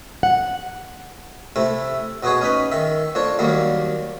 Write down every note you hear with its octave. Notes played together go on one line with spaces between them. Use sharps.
F#5
C3 A3 E4
B2 B3 F#4 G#4 C#5
C#4 D#4 B4 B5
D#3 E5
F2 D4 C#5
D#2 F#3 G3 A#3